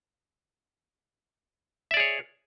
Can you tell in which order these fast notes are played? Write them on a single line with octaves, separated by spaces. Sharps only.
E5 D5 G#4 C#5